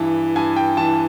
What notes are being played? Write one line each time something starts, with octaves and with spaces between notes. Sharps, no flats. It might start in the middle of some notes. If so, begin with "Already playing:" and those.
Already playing: G2 E3
G2 G#5
G5
E3 A5